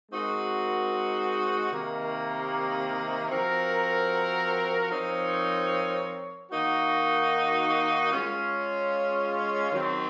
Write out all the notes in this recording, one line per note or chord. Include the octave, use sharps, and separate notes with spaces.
G#3 C4 D#4 F#4 A#4
C3 D#3 A#3
F3 C4 F#4 A#4
F3 C4 D#4 A#4 C#5
D#3 A#3 D#4 F#4
G#3 C#4 F4
D#3 F#3 C4